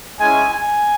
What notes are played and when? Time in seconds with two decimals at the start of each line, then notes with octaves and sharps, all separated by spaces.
0.21 G#3 C#4 E4 G#5
0.54 G#5